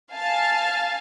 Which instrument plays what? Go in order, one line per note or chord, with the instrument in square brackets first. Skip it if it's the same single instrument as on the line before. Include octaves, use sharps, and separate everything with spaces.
[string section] F5 G#5 A5